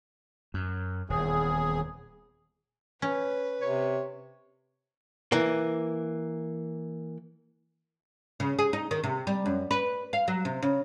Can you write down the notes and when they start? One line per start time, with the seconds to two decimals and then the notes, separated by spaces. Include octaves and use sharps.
0.54 F#2
1.10 D#1 E2 G#4
3.02 C#4 B4
3.62 C3 C#5
5.32 E3 A#3
8.40 C#3
8.59 G#4
8.73 D#4
8.91 D#3
9.04 C3
9.27 G3
9.46 F#2
9.71 B4
10.13 F5
10.28 F#3
10.45 C3
10.62 C#3